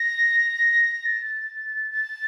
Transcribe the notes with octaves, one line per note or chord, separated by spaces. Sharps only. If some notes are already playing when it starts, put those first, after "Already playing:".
Already playing: A#6
A6
A6